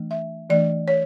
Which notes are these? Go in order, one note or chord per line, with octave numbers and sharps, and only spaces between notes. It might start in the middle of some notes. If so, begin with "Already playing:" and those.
Already playing: E3 A3 D4
E5
E3 A3 D4 D5
C#5